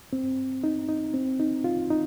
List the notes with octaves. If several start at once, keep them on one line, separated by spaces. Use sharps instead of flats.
C4
D#4
D#4
C4
D#4
F4
D#4